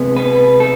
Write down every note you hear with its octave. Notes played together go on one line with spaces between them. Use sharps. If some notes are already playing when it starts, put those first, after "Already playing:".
Already playing: C3 G#3 B3
B4
A4